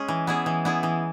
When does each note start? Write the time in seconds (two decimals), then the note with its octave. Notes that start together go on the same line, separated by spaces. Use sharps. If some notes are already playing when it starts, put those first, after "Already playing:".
Already playing: G#3 C#4 G#4
0.08 E3
0.27 B3 E4 G#4
0.46 E3
0.65 B3 E4 G#4
0.83 E3